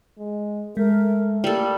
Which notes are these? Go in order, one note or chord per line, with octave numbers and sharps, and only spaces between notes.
G#3
G#3 A3 A#4
G3 A#3 A4